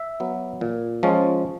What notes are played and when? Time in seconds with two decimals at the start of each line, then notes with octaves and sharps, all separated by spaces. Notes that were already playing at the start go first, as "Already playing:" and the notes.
Already playing: E5
0.20 F#3 B3
0.61 A#2
1.03 F3 G#3 C#4